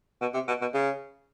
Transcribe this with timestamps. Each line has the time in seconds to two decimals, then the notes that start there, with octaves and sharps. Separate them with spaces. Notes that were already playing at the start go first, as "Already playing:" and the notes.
0.21 B2
0.34 C3
0.48 B2
0.61 B2
0.74 C#3